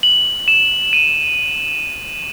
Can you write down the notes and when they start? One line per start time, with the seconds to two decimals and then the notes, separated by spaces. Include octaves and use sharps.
0.03 F#7
0.48 E7
0.93 D#7